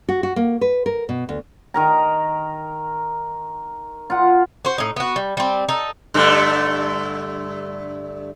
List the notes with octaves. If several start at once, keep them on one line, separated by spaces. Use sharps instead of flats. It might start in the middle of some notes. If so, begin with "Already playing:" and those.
F#4
F#4
A#3
B4
A#4
B2
D2
D#3 A#4 A#5
F4 F#5
F#4 C5
A2 D#4
B3 F#4
G3
G3 C4
D#4 A4
G2 D3 A3